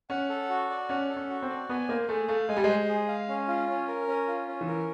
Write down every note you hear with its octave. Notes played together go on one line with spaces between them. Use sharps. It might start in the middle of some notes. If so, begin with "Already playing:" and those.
C#4 F#5
A4
F#4
D5
C#4 F#5
A4
C#4
F#4
C4
D5
B3 G#5
A#3 C5
A3 G#4
A3 F5
G#3 G#5
G3
G#3 C5
G#4
F5
C#4
F4
C#4
A#4
C#4
F4
C#4
E3
A#4